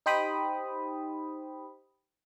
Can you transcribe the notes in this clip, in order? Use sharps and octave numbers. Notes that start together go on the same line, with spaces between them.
D#4 G4 C5 G5 B5 D#6